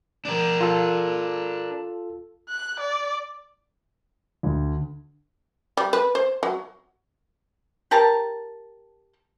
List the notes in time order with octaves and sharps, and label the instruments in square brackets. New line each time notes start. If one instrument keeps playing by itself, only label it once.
[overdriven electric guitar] D4 A#4
[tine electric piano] F4 A4
[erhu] F#6
D5
[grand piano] D2
[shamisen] G3
B4
C5
F#3
[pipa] G4 A#4 A5 A#5